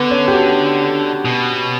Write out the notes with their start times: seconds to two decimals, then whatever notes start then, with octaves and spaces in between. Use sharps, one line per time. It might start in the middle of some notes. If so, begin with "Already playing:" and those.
Already playing: D3 B3
0.10 C#4
0.28 G4
0.33 F#4
1.25 B2